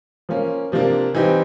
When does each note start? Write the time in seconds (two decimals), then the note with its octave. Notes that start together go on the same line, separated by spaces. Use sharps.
0.29 F3 A#3 C#4
0.72 C3 F3 A#3 D4
1.14 E3 G3 C4 D#4 G4